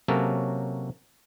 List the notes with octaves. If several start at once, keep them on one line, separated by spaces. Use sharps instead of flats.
C3 F#3 A#3 C#4 F#4 A4